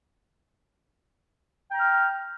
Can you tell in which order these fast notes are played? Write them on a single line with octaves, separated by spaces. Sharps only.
G5 A#5 F6